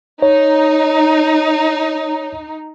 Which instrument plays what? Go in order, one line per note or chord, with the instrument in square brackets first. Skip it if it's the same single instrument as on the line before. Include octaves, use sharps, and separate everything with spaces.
[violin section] D#4 [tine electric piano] C#5